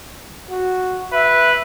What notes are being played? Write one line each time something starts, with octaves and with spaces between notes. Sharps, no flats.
F#4
B4 E5